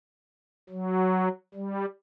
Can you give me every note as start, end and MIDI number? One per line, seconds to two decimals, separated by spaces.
0.70 1.29 54
1.54 1.86 55